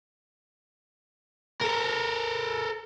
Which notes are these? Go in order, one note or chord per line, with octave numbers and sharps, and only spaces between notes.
A4 A#4